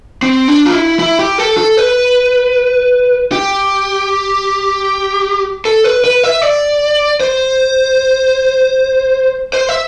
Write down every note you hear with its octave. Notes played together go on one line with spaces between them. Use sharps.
C4
D4
F4
E4
E4
G4
A4
A4
B4
G4
A4
B4
B4
E5
D5
C5
C5
E5